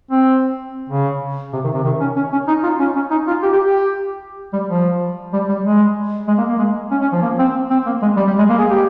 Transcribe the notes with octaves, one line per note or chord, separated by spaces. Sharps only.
C4
C#3
C3
D#3
C3
D#3
C#4
C#4
C#4
D#4
F4
C#4
C#4
D#4
F4
G4
G4
G4
G3
F3
G3
G3
G#3
G#3
A#3
A#3
G#3
C#4
C#4
F3
A#3
C4
C4
A#3
G#3
G3
G3
G#3
A#3
G#4
G4